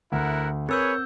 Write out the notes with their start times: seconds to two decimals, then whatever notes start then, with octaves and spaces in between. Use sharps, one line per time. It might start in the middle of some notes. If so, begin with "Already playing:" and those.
0.12 D2 E4 A#4 F#5
0.69 C4 G#4 A#4 B4 C#5 E6 G6